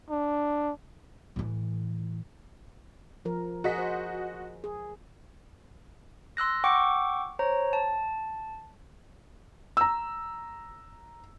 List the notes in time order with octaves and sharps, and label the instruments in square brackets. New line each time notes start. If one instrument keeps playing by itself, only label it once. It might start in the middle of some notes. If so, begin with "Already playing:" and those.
[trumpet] D4
[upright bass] A2 E3
[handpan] F3 A#4
[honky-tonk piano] F#4 D#5 B6 [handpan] G#4 A#4
[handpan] C5
G#4
[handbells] C6 E6 F#6 A#6
F#5 G5 C#6 D6 E6
C5 C#5 A#5
A5
[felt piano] A#5 E6